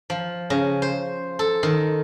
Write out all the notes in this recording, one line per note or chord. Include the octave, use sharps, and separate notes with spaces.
F3
C#3
C5
A4
D#3